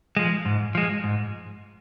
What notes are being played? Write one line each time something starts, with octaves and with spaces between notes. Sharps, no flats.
F3 G#3
G#2
F3 G#3
G#2